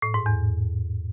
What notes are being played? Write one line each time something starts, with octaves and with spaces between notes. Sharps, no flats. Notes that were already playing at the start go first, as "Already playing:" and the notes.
A2
G#2
E2